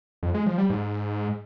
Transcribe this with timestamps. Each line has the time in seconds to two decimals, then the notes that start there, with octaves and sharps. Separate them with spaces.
0.23 F2
0.34 G#3
0.46 F3
0.58 G3
0.70 G#2